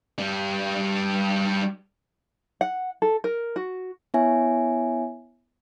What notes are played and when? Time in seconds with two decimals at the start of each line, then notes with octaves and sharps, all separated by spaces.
0.18 G3 D4
2.61 F#5
3.02 A4
3.24 A#4
3.56 F#4
4.14 B3 E4 C#5 E5 G#5